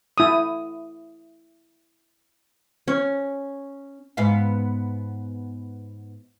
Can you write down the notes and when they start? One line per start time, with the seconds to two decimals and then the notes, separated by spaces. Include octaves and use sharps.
0.18 E4 D#6
2.88 C#4
4.17 G#2 B3 F5